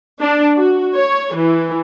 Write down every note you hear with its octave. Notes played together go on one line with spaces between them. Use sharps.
D4
F#4
C#5
E3